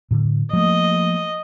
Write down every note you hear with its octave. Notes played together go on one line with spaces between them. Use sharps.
A2 D3
F3 A3 A#3 D#5